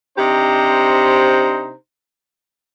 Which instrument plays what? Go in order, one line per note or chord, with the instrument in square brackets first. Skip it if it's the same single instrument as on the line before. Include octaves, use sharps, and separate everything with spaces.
[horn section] C3 D4 D#4 G4 C5 A#5